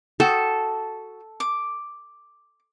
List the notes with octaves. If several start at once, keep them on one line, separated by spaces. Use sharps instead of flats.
F#4 A4 G5 D#6
D6